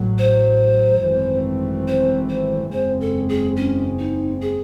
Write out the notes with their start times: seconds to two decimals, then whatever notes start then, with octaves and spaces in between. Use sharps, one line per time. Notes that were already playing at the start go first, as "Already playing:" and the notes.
Already playing: A1 A2 F#3
0.18 C5
1.03 G#1 F#2 E3 A3 C4
1.88 C5
2.29 C5
2.72 F#1 E2 C#3 G#3 C4 C5
3.01 A4
3.29 G#4
3.57 C#4
3.99 D#4
4.42 G#4